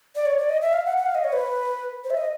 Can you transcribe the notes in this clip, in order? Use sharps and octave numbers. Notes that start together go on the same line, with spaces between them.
D5
C#5
D5
D#5
E5
F5
F#5
F#5
F5
D#5
C#5
B4
C5
E5
D#5